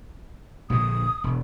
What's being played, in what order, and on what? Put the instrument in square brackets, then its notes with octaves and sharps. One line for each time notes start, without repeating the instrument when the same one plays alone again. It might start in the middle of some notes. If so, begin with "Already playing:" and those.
[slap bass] A#1 A#2 D3 [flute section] D#6
[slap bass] E1